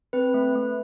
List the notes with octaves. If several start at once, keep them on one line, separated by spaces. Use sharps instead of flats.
C4 B4
A3
A3